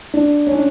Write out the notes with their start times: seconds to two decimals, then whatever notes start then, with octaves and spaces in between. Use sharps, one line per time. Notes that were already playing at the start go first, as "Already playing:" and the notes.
0.14 D4
0.47 C#4
0.55 D4